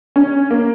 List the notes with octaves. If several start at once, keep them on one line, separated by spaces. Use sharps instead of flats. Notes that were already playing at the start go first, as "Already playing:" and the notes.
C#4
A#3